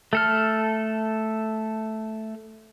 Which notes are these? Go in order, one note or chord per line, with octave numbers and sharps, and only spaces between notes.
A3 A4 F6